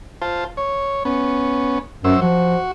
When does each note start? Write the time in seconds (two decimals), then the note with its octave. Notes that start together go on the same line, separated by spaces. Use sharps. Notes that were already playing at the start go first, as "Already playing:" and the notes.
0.22 F4 C5 A5
0.57 C#5
1.05 B3 C#4
2.04 F#2 F#3 C5 E6
2.22 F3 F#4